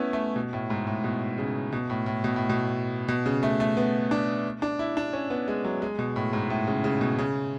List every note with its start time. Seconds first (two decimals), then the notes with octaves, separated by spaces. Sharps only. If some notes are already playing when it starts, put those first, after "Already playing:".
Already playing: A3 B3 C#4 E4
0.13 A3
0.36 B2
0.53 A2
0.70 G#2
0.87 A2
1.04 B2
1.38 C#3
1.72 B2
1.90 A2
2.06 A2
2.24 B2
2.36 A2
2.49 B2
3.08 B2
3.26 C#3
3.43 A3
3.60 A3
3.77 B3
4.11 D4
4.62 D4
4.79 E4
4.97 D4
5.13 C#4
5.30 B3
5.48 G#3
5.64 F#3
5.82 G#3
5.99 B2
6.16 A2
6.33 G#2
6.50 A2
6.67 C#3
6.84 C#3
7.01 B2
7.19 C#3